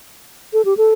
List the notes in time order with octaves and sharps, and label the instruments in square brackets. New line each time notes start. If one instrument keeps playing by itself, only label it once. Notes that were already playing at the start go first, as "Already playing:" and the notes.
[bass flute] A4
G4
A4